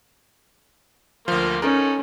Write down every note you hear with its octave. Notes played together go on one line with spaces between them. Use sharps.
D2 F3 A#3 C6 F6
C#4 D#4 A4 A#4